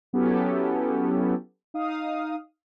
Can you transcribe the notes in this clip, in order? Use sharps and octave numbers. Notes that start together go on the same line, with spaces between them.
F#3 B3 C#4 E4 G4 A4
D#4 F5 D#6